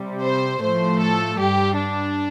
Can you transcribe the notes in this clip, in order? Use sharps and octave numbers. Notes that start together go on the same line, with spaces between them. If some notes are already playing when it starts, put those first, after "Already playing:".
Already playing: C3 G3
C5
A2 F3 A3 C5
A4
G2 G3 G4
D4